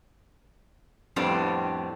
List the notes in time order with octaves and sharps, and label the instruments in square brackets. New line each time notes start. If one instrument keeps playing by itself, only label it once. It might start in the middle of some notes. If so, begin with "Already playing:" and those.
[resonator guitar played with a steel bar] F2 A2 G3 B3 C4 D4